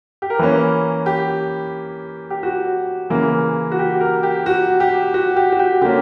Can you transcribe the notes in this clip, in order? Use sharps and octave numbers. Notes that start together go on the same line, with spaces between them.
G4
A#4
E3 A#3 C#4 B4
G4
G4
F#4
C#3 E3 A#3
F#4
G4
A#4
G4
F#4
G4
F#4
G4
F#4
G4
D3 A#3 C#4 G4